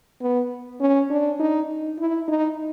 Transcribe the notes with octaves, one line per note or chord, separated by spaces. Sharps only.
B3
C#4
D4
D#4
E4
D#4